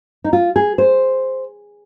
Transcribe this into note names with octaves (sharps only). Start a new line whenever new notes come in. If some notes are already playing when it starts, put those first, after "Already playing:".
D#4
F4
G#4
C5